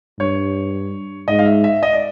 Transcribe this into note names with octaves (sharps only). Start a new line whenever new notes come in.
G2 C#5
G#2 D#5
F5
E5
E5
D#5
D5